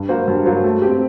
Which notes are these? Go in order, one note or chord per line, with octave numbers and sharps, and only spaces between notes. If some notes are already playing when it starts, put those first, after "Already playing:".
Already playing: G2
F#3 A#3 F#4 C5
G2
F#3 A#3 F#4 C5
A3
C4 G4